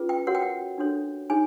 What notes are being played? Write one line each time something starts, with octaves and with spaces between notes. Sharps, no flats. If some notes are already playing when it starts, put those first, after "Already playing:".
Already playing: C#4 F4 G#4 B4
G5
F#4 A#4 C#5 F#5
G5
F#5
D4 F#4 A4 C#5
D#4 G#4 C#5 G#5